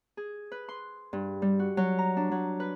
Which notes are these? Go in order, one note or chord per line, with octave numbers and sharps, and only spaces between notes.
G#4
B4
C6
G2
G3
F#4
F#3
A#5
D4
F#3
B4